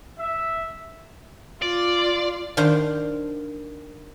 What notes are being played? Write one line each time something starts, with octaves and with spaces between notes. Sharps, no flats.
E5
F4 D5
D#3 D4 C5 F5 G5